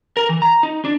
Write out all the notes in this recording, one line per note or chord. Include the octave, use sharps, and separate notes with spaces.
A#4
E3
A#5
D#4
D4